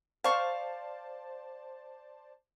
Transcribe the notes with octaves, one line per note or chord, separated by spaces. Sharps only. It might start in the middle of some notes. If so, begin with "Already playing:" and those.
C5 D5 F5 A5 C#6